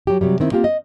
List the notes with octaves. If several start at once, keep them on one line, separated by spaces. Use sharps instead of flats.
F#3 G4
C3 F#3 G3
D#3 C4 E4
A#3 C4 F4 G4
D#5